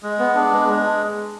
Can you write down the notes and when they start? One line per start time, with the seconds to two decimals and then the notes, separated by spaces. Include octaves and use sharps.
0.03 G#3
0.19 B3
0.35 D4
0.52 G#3
0.68 G#3